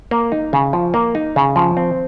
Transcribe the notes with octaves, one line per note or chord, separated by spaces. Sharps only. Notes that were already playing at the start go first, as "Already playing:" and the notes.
A#3
D#4
C#3
F3
A#3
D#4
C#3
F3
C4